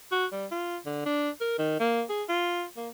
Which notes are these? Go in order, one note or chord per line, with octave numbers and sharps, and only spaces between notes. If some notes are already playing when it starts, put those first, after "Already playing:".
F#4
G3
F4
D3
D4
A#4
D#3
A#3
G#4
F4
A#3